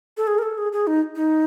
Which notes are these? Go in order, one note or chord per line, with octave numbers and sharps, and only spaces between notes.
A4
G#4
A#4
A4
G#4
G#4
D#4
D#4